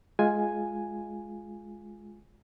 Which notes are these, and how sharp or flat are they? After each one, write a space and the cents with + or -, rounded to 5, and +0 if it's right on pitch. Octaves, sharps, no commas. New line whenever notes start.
G#3 +15 F4 +0 G#5 +0